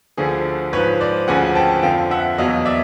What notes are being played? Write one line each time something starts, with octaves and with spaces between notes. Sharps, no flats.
D2 D3 F3 G#4
G#2 F3 B4 C#5
C5 D5
D2 C#3 F3 F#5 G#5
G5 A5
F2 D3 F3 F5 G5
E5 F#5
E2 B2 F#3 D#5 F5
D5 E5